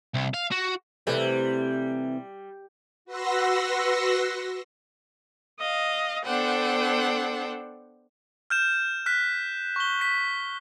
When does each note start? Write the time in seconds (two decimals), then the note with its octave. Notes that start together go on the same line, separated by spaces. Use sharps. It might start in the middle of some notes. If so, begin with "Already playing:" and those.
0.14 C2
0.34 F5
0.52 F#4
1.07 C3 E3 G3 A3
3.05 F#4 B4 F#5 C6 E6 A#6
5.59 D#5 F5
6.24 B3 D4 A4 C5 F#5 G5
8.50 F6 G6 E7
9.06 F6 F#6 B6
9.76 C#6 G7
10.01 B6